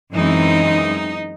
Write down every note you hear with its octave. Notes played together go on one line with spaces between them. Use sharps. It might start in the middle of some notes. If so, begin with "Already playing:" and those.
F#2 E3 G#3 C4 D#4